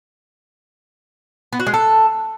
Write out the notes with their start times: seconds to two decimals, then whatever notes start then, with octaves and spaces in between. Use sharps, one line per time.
1.53 B3
1.60 F#4
1.67 G#3
1.74 A4